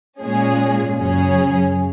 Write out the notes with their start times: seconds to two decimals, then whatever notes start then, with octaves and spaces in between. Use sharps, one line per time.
0.22 A#2 G#3 C#4 G#4
0.97 F#2 C#3 F#3 C#4 G#4